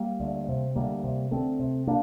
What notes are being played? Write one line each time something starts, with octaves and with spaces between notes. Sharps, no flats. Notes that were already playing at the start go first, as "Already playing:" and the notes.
Already playing: G3 A#3
D2
C3
D2 G3 A#3
C3
D2 A3 C4
C3
A#3 D4